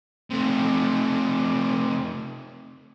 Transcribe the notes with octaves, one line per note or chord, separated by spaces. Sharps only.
C3 A3